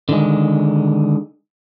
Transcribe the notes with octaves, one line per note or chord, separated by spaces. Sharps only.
D3 D#3 G#3